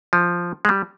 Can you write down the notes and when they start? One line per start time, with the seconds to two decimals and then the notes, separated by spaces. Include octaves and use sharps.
0.13 F3
0.65 G#3
0.69 G3